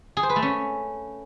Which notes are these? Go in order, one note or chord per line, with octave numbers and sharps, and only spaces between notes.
G#4
C5
B4
A3
C#4